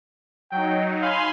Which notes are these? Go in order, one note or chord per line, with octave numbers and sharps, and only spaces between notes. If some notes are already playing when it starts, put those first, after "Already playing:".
F#3 D#4 G5
F5 G#5 B5 C6